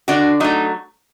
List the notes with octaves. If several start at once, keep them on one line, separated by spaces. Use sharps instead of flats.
D3 D4 F#4
F#3 A3 D#4